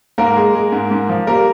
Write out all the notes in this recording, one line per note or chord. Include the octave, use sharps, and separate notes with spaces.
G#2 A#3 A#4
G#3
G#3
G#2
G#2
F3
G3 A#3 A#4